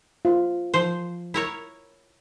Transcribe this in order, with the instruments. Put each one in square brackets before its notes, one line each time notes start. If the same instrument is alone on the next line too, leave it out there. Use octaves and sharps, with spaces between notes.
[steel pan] F4
[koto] F3 C5
E4 A#4 C#5